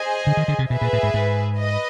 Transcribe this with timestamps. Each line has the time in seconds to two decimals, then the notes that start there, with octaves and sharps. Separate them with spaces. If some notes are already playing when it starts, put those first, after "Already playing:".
Already playing: G#4 C5 D#5 G#5
0.27 D3
0.37 D#3
0.48 D3
0.59 C3
0.70 B2 G#4 B4 E5
0.81 A#2
0.93 A2
1.03 G#2
1.14 G#2
1.59 B4 D#5